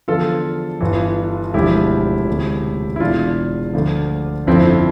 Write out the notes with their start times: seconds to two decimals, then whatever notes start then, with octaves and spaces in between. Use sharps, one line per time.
0.08 E2 D3 F3 F4 A4
0.80 G1 G2 E3
1.54 E1 D2 D3 F3 E4 G4
2.28 E1 D2 C3
2.96 E4
3.00 E1 E2 E3 D4 F4
3.74 D2 D3 F3
4.47 G1 F2 D3 F3 C4 E4